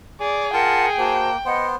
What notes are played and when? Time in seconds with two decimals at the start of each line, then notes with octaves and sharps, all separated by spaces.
0.21 G#4 D5
0.53 F4 A#4 F#5 G5 A5
0.97 A#3 F#4 C5 A5
1.46 B3 C5 D#5 F#5